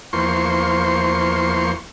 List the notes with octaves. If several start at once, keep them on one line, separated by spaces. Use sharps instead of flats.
E2 F3 A#3 C5 C6 C#6